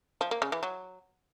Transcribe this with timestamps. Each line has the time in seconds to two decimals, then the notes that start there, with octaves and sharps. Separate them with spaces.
0.21 F3
0.31 A#3
0.42 C#3
0.52 E3
0.63 F#3